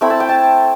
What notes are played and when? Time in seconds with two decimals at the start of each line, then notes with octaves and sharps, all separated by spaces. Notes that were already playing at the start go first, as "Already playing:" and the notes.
0.01 A3 C4 E4 B5
0.10 A5
0.20 G5
0.29 A5